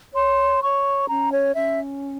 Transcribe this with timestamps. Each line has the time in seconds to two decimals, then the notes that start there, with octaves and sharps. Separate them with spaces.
0.13 C#5 C6
0.61 C#5 C#6
1.08 C#4 A#5
1.32 C#5
1.54 C#4 E5